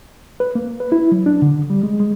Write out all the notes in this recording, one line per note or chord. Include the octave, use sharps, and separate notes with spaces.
B4
A#3
B4
E4
F#3
D4
D3
G3
G#3
G#3